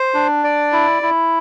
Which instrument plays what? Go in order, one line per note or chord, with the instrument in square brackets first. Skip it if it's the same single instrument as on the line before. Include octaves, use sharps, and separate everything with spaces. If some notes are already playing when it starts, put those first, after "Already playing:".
Already playing: [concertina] C5
D4
D5
E4
E4